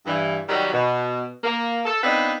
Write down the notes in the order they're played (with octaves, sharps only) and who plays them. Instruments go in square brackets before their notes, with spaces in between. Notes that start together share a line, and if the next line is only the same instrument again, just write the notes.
[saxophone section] G2 E3
D#3 F#3 G3
B2
A#3
A4
B3 C4 D4 D#4 F4 B4